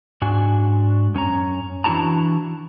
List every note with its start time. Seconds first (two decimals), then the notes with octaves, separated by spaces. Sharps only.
0.22 G#2 D4 F#4 G#5
1.14 F#2 C#4 C#5 A#5
1.84 E3 D4 E4 F#4 A5 A#5